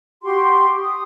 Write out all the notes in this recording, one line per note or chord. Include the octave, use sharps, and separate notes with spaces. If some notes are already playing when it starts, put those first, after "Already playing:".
F#4 G4 G5 C6
D#6